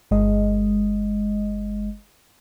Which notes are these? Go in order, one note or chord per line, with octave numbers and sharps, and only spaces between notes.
G1 G#3 D#5